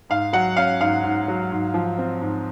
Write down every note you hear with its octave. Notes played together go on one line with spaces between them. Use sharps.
G#2 F5
F#3 F#5
C#4 F5
G#2 F5
G#2
F#3
G#2
F3
C4
G#2